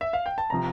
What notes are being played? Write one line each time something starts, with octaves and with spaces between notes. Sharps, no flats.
E5
F5
G5
A5
C3 F3 A#5